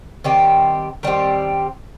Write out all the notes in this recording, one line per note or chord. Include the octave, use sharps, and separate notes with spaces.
D#3 G3 C4 G4
D#3 G3 C4 G4